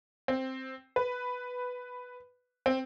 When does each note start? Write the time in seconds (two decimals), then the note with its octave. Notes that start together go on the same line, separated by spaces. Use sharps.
0.28 C4
0.96 B4
2.66 C4